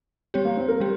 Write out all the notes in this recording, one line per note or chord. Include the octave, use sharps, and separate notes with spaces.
G3 C4 G4 C#5
A#3
C4
A#4
G3 C4 G4